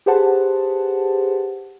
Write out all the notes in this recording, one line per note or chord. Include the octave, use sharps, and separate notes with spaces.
G4 G#4 B4 C5 F#5 A5